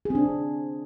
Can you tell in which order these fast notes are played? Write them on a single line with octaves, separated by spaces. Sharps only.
G#4 C4 D4